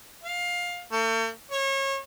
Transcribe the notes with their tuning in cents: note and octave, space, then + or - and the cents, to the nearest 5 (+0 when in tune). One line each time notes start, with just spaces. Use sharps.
F5 +15
A3 +40
C#5 -30